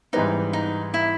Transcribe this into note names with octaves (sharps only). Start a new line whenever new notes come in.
G#2 E3 G3 B3 D#4
D#4
E4